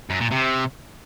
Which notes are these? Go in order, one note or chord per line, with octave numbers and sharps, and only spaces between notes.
F#2
A#2
C3